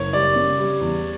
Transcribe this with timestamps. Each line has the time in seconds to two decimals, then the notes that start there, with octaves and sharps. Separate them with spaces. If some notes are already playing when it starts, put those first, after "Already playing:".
Already playing: F#1 C#5
0.13 G3 D5
0.36 C#3
0.59 G3
0.81 E2